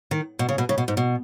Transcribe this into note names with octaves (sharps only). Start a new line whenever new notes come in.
D#3
B2
C#3
B2
C#3
B2
G#2
B2